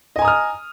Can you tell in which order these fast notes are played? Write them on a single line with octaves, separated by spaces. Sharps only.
D#5 G#5 A#5 D#6 F6